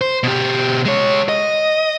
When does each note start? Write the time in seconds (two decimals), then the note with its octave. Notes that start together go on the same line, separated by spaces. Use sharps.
0.01 C5
0.23 B2 G4
0.86 G#3 C#5
1.29 D#5